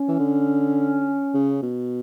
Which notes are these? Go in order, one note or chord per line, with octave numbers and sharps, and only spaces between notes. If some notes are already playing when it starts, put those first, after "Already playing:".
Already playing: C#4
E3
D3
C#3
B2